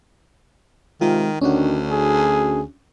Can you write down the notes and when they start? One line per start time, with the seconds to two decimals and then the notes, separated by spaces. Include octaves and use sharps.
1.01 C3 D#3 G#3 F4
1.41 D2 D#3 C#4 D4 F#4
1.91 G#4